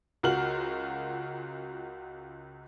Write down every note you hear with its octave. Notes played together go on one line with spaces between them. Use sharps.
C#2 F4 F#4 A#4 F6 F#7